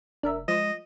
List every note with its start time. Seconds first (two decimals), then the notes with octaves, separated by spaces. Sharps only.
0.23 F1 D4 A#4 E5
0.48 F3 G#3 D#5 E7